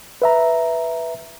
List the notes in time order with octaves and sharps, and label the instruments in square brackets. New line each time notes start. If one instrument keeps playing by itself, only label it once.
[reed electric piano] B4 E5 A#5